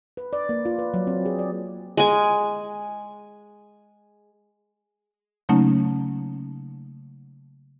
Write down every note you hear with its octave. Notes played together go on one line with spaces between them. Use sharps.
B4
D5
A#3
F4
B4
F#3
C4
G#4
D5
G#3 G#5
C#3 F#3 A3 A#3 C#4 D#4